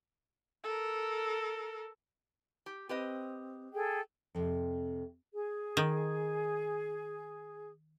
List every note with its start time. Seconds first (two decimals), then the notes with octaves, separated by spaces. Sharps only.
0.64 A4 A#4
2.66 G4
2.89 C4 G4 B4 D#5
3.74 G#4 A4 G5
4.35 F2 C3
5.33 G#4
5.77 D#3